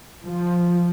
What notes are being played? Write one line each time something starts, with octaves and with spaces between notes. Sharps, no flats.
F3